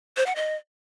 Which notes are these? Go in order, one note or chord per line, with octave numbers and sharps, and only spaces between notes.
C5
F#5
D#5